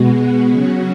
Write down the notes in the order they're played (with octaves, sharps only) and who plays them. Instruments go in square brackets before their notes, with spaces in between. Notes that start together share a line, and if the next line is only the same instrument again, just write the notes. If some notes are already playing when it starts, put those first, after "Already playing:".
Already playing: [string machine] B2 G#3 B3 F#4
F#4
C#3 F#3 C#4